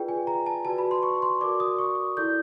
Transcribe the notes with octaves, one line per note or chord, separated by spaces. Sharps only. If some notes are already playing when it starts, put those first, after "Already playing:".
Already playing: F4 G#4 B4 D5 G5
G#5
A#5
A5
F#4 B4 D5 A5
B5
C6
C#6
C6
F#4 A#4 D5 D6
D#6
C#6
E4 A4 D5 G6